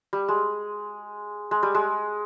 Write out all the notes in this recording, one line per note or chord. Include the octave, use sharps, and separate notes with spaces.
G3
G#3
G#3
G3
G#3